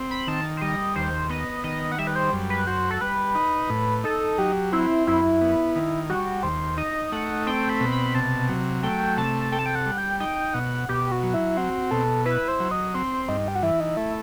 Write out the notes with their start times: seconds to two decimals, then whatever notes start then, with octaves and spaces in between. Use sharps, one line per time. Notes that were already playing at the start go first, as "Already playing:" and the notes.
Already playing: C4
0.11 B5
0.27 D#3 A5
0.57 C5
0.62 G3 D#5
0.96 D#2 C5
1.30 B3 D#5
1.64 D#3 D#5
1.92 F#5
1.98 G3 E5
2.07 B4
2.16 C5
2.33 F#2
2.50 B4
2.67 F#4 C5
2.90 A4
3.01 G3 B4
3.35 D#4
3.70 A2
4.04 D#4 A4
4.38 F#3 G4
4.72 C4 E4
5.07 F#2 E4
5.41 B3
5.76 D#3
6.09 G3 F#4
6.43 D#2 C5
6.77 D#4 D#5
7.12 A3 F#5
7.47 C4 G5
7.69 B5
7.81 B2
7.92 B5
8.15 C3 A5
8.49 F#3
8.83 A3 G5
9.17 C3 A5
9.52 A4 G5
9.59 A5
9.66 G5
9.75 F#5
9.86 G3
9.98 G5
10.20 D#4 G5
10.54 B2 F#5
10.89 B2 G4
11.12 F#4
11.23 F#3
11.34 E4
11.57 C4 F#4
11.91 B2 A4
12.25 E4 B4
12.48 C5
12.60 F#3
12.71 D#5
12.94 C4 C5
13.28 G2 D#4
13.48 G4
13.55 F#4
13.62 E3 E4
13.80 D#4
13.97 A3 E4